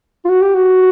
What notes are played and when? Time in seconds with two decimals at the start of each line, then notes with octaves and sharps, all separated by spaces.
0.25 F4
0.29 F#4
0.42 G4
0.55 F#4